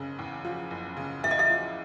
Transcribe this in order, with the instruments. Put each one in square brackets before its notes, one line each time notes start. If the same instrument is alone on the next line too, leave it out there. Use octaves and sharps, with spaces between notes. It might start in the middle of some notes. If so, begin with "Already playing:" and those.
Already playing: [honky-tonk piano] F#1 C#3
E2
F3
F#1
C#3
[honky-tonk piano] E2 [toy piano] E5
[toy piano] D#5
E5
[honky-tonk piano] F3